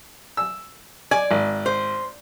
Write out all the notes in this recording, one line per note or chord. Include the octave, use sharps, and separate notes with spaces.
E6
D5 G#5
G#1
C5